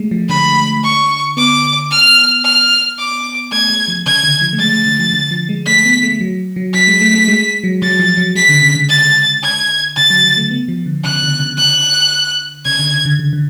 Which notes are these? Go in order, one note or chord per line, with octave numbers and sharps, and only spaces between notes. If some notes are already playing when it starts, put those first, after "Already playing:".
Already playing: G#3 A3
F3
D3 B5
C#6
B3 D6
F6
F6
D6
A3 G#6
G#3
F3
C#3 G#6
D3
F3
A3
G#3 A6
A3
D3
F3
D3
F3
G#3
A3 B6
B3
A3
F#3
F#3
F#3 B6
G#3
A3
A3
G#3
F#3
F#3 A6
F3
F#3
G#3 B6
D3
C#3
D3
A6
G#6
C#3 A6
F#3
F#3
A3
B3
F3
D3
C#3 F#6
D3
C#3
D3 F#6
C#3 G#6
D3
D3
D3
D3